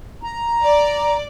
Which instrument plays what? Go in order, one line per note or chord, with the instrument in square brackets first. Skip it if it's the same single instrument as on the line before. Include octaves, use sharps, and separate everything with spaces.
[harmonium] A#5
[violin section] D5